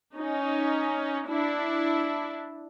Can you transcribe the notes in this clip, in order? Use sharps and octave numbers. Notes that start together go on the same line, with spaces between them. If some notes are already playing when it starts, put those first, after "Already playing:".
C#4 D#4
D4 E4